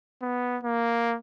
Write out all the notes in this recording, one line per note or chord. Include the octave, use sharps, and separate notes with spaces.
B3
A#3